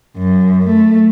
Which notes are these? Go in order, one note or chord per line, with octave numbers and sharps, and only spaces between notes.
F#2
A3